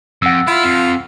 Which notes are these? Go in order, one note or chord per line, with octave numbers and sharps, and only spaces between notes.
F2 F#5 E6
E4 F4
F2